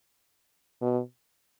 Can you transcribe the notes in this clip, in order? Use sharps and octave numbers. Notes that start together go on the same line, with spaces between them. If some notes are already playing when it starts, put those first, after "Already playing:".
B2